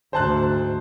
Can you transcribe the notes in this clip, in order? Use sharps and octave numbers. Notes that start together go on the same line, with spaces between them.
D2 G#2 C5 A5 F#6